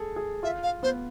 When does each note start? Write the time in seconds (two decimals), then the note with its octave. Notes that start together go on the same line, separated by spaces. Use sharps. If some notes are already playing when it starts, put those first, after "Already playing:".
Already playing: G#4 A4
0.16 G#4
0.43 F4 E5
0.63 F5
0.83 B3 C5